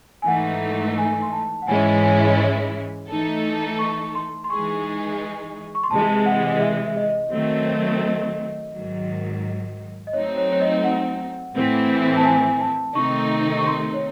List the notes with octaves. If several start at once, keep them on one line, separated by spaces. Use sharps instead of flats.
G#5
G#2 E3 A3 D#4 F#5
G#5
C6
A5
F#5
G#2 E3 G#3 C#4 E4 G#5
G#5
E3 A3 D#4 A4
C#6
C6
C6
E3 G#3 D#4 G#4 C#6
C#6
C6
C3 E3 G#3 A5
F#5
D#5
E5
E5
D#5
D#3 F#3 A3 C4
D#5
G#2 D#3 F#3
D#5
F#3 A3 C4 D#4 C#5
C#5
C#5
D#5
F#5
A2 E3 C4 E4
A5
G#5
A5
C3 D#3 A3 C4 D#4 C#6
C#6
C6
C#5